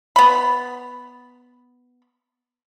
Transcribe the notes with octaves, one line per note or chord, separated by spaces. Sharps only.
B3 B5